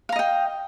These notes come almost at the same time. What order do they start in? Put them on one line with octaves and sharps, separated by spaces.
F5 A#5 D#5 G5